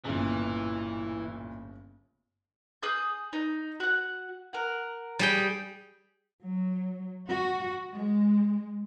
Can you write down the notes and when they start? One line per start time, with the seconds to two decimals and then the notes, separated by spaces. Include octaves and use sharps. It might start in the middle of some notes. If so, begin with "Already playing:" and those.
0.05 D1 G1 A#2 C#3 E3
2.83 G#4 D#6 G6
3.33 D#4
3.80 F#4 F#5
4.53 A#4 F#5
5.19 G3 G#4 G5
6.43 F#3
7.28 F#4
7.95 G#3